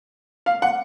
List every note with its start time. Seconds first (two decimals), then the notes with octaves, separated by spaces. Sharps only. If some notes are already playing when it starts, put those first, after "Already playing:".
0.46 F5
0.62 F#5